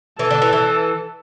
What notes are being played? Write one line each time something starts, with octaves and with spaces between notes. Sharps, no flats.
E3 A4
D3
E3
E3